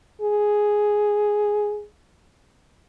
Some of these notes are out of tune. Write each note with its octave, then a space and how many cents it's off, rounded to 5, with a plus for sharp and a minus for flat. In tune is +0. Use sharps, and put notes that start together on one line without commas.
G#4 +5